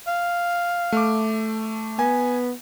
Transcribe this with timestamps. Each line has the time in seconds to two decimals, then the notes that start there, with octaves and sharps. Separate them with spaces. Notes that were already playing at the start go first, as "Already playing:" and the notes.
0.07 F5
0.92 A3 D6
1.99 B3 G#5